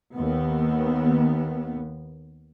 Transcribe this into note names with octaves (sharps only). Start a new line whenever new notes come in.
D#2 B3